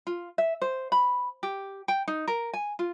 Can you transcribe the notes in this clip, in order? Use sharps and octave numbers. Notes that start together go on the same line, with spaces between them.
F4
E5
C5
B5
G4
G5
D#4
A#4
G#5
F4